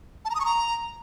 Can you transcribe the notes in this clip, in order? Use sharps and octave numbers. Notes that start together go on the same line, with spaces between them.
A5
A#5
D#6
C#6
A#5